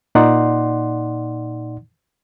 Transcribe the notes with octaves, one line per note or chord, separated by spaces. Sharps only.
A#2 D#4 D5 F#5 C6